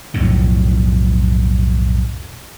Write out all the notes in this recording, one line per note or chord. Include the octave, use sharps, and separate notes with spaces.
B1 F2 A2 C#3